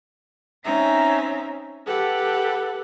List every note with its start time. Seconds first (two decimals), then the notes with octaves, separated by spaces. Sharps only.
0.65 C4 C#4 D#4 E5 A#5
1.87 G4 A4 B4 F#5